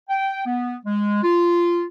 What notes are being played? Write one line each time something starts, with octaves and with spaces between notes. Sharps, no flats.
G5
B3
G#3
F4